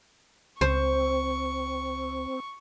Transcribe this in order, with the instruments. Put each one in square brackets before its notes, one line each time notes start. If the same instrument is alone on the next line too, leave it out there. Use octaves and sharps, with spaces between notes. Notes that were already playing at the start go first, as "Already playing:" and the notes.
[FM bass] C#2 [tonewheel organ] C4 [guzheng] C5 [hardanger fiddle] C#6